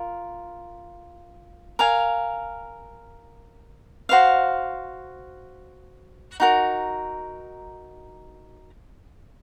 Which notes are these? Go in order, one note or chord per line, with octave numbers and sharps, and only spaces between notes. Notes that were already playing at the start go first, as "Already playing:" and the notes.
Already playing: F4 A#4
A#4 F5 G#5
F#4 C5 F5
D#4 F#4 A#4